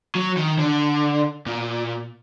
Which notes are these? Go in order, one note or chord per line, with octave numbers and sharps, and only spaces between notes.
F#3
D#3
D3
A#2